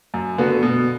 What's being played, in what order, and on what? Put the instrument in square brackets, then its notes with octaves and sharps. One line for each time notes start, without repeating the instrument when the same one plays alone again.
[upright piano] F#2
D3 B3 F#4
B2